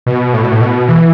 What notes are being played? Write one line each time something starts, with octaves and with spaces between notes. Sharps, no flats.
B2
A2
B2
A2
B2
E3